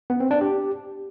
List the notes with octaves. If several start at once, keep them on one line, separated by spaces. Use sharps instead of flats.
B3
C4
D4
G4